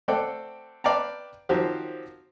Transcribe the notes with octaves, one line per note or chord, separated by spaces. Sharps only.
A3 C4 A4 D5 F#5 G5
B4 D5 F5 G5 A5 A#5
D#3 F3 F#3 C4 F#4 G4